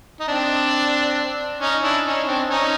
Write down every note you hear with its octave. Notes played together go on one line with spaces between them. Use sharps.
D#4
C4 D4
C#4 D#4
D4 E4
C#4 D#4
C4 D4
C#4 D#4